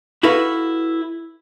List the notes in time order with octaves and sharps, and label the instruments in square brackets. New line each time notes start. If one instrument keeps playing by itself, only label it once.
[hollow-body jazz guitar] E4 F#4 A4 B4 F5